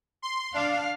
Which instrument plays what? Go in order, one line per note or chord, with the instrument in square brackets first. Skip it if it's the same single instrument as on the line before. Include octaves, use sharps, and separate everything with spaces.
[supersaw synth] C6
[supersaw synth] D4 [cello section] F5